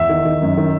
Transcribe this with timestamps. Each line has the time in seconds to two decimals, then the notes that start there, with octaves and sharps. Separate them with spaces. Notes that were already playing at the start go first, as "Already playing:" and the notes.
Already playing: E2 E5
0.09 D#3
0.25 D#3
0.42 F#2
0.57 D#3